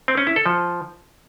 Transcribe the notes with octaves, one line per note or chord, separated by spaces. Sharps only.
C4
C#4
E4
A4
F3